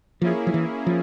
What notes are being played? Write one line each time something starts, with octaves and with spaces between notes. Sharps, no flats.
F3 A#3 C#4 E4 G#4
F3
E3
F3